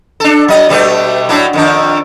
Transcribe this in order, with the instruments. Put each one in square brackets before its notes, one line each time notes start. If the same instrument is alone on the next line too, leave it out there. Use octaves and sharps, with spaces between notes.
[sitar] D4 A4
F#3 D#5
B2 G3 A3
A2 F#3 D4
F2 D#3 D4